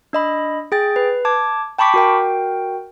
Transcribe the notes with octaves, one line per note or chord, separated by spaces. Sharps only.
D4 D#5 B5
G#4 G5 A6
B4
A5 D6 G#6
G5 A5 B5 C#6 D6 B6
F#4 A#4 G5